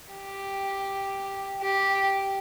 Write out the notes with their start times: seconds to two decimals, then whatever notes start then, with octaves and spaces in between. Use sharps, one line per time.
0.13 G4
1.61 G4